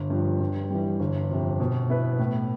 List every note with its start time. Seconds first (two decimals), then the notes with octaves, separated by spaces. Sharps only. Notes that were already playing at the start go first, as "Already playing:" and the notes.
Already playing: G1
0.10 G2 F3
0.40 G2
0.70 E3 G3
1.00 G1
1.30 F2 C3
1.60 B2
1.89 B3 E4 B4
2.19 A2